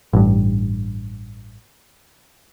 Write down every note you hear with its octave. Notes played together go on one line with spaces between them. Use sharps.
A1 G2